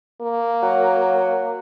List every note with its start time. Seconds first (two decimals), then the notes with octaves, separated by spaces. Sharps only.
0.22 A#3
0.62 F#3